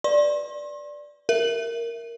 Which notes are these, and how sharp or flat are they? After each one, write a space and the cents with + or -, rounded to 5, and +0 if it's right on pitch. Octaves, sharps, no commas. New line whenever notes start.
B4 +0 D5 +0 C6 +40
A#4 +0 E5 +0